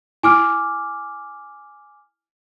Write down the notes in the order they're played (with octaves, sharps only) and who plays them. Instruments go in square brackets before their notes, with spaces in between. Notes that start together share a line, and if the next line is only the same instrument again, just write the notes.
[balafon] E4 [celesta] G#5 D6 F6